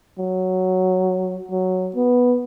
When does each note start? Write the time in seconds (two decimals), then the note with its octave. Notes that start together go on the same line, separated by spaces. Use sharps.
0.18 F#3
1.51 F#3
1.95 B3